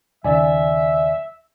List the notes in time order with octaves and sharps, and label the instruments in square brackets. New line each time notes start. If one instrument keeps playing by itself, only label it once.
[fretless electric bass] D#2 C#3 [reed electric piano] D5 G#5 [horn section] E5